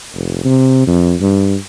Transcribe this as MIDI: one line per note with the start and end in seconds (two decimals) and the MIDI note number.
0.14 0.43 29
0.45 0.87 48
0.87 1.14 41
1.21 1.55 43